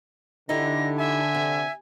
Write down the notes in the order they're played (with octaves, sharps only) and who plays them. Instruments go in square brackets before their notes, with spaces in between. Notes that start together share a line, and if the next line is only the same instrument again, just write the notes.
[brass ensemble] D3 [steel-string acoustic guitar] D#4 E4 G4 [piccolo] A#6
[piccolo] E5 [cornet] G#5
[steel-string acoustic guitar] C3